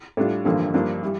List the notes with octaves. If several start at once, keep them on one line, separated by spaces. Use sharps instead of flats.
A2 G3 D4 F4
A1 G2 D3 F3 A#3
G2 F3 A#3 D4 F4
E3 G3